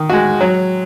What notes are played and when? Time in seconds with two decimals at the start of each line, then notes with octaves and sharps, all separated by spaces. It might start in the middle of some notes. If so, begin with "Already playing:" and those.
Already playing: D#3
0.09 G#3 F#4
0.41 F#3